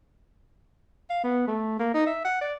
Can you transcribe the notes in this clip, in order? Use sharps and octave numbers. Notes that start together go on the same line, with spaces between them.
F5
B3
A3
A#3
D#4
E5
F#5
D5